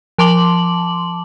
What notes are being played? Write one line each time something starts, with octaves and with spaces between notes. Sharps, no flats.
F3 A5 C6 D6 F#7